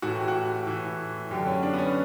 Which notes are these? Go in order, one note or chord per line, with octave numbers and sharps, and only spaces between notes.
A2 E3 F#4
G4
F#4
A2 E3
F#2 D3 G4
C#4
D4
B3
C#4